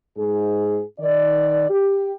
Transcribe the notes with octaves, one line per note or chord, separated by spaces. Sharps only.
G#2 G#4
D#3 D5
G4